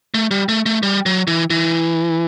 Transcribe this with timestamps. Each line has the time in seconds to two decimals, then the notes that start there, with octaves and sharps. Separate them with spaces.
0.14 A3
0.31 G3
0.49 A3
0.66 A3
0.83 G3
1.06 F#3
1.27 E3
1.50 E3